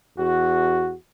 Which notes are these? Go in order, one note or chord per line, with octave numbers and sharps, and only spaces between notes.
E2 F#4